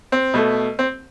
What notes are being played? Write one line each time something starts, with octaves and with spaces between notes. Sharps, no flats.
C4
B2 A3
C4